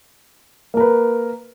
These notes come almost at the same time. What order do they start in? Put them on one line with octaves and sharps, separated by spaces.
A#3 A#4 B4